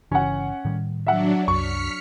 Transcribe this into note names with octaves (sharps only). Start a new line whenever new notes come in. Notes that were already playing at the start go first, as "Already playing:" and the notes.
G1 C#3 E3 C#4 F#5
A2 D#3 G3
F#3 D4 E5 F#5
C2 F#2 C#6 F6 B6 C#7